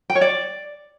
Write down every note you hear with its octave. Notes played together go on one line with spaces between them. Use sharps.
G5
C#5
D5